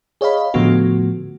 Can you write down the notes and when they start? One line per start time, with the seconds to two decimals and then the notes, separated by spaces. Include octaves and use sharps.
0.21 G#4 C#5 D#5 F5 B5
0.54 A2 D3 F3 A3 B3 F#4